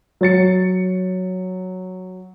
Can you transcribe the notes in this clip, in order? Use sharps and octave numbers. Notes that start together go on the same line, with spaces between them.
F#3 C#5 A6 C#7